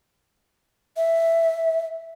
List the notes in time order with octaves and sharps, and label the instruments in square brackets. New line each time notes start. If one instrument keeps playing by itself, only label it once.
[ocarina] E5